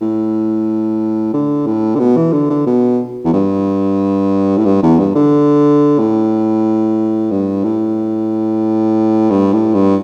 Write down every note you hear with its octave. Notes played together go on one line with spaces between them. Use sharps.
A2
D3
A2
D3
B2
E3
D3
D3
B2
E2
G2
A2
G2
E2
G2
D3
A2
G2
A2
G2
A2
G2